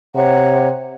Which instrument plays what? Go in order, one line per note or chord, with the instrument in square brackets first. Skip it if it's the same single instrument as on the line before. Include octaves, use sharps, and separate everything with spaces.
[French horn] C3 [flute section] C#5 F#5 A#5